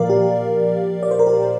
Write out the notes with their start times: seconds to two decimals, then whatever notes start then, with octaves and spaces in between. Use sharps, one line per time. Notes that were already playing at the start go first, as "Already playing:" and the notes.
Already playing: A#2 F3 A#4 D5 F5
0.10 G4
1.03 D5
1.11 C5
1.19 A#4
1.27 G4